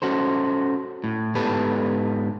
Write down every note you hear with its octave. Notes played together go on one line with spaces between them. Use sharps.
C#4 F#4 A4 C5
A2
G#2 B3 G4 A4 B4 A5